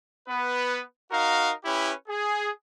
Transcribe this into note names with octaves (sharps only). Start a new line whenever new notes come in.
B3 B4
D#4 F#4 A#4 F5
C#4 E4 G4 B4
G#4